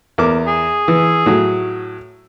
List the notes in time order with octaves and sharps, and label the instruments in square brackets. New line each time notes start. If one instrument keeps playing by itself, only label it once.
[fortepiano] E2 A#4 D6
[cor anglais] G#4
[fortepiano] E3
A2 F#3